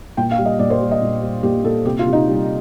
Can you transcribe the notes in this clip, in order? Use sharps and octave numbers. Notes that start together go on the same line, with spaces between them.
A#2 G5
F5
G3
D#5
A#2 D5
C5
G3
D#5
A#2
G3
A#2 G4
A#2 A4
C3 G4
F4
C3
D#4
G3